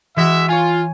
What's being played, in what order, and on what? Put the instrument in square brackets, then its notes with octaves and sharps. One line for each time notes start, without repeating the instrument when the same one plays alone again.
[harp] E3 [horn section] G#3 F#4 E5
[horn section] F4 [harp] C#5 G#5